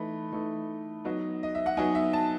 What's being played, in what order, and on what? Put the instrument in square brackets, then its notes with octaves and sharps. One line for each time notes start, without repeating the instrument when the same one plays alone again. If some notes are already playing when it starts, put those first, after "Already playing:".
Already playing: [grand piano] E3 A3 D#4 B5
E3 A3 D#4
F#3 B3 D#4
D#5
E5
F#5
F#3 B3 D#4 G#5
E5
A5